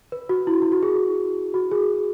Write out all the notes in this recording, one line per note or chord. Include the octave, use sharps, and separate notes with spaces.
B4
F#4
E4
E4
F#4
G#4
F#4
G#4